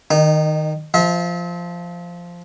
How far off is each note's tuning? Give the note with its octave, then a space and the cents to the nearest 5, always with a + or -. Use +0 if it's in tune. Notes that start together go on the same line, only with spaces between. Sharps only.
D#3 +0 D#4 -30
F3 -5 E5 -40